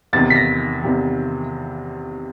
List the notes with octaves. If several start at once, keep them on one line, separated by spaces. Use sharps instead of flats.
E2 C3 D#3 A6
B6
A#6
E2 C3 D#3